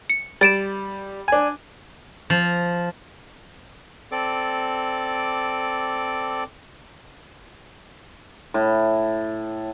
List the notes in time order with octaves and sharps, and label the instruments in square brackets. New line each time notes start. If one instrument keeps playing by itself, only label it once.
[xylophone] C#7
[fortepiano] G3 [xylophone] A6 D7 E7
[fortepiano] D4 G#5
[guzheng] F3
[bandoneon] C4 A4 D5 D6
[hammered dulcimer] A2